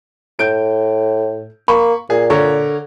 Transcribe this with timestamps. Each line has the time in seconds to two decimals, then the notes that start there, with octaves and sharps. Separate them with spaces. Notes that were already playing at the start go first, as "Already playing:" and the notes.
0.39 A2 G6 D7
1.68 A#3 B5 C#6
2.10 A#2 G#4
2.30 D3 A#4 C#5